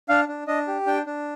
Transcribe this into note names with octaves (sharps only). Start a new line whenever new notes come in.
D4 F5
D4
D4 D#5
G4
D4 G5
D4